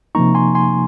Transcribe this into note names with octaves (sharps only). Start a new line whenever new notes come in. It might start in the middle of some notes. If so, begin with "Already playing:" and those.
C3 F3 A#3 D#4 A#5 C#6
G#5 C6
G#5 C6